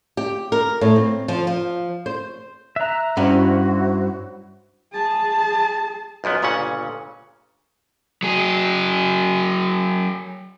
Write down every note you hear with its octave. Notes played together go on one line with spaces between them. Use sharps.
G4
A#4
A2
C4
F3
F3
C5
E5 A#5 F#6
G2 C#4 E4 F#4 C5 F#5
G#4 A5
B1 F#2 F3 B3
G1 A#2 C#3 C#4 F#5
F#3 G#4